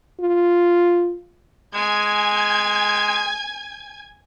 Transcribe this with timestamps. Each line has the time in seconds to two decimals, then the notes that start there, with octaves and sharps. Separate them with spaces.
0.20 F4
1.74 G#3 G#5 G#6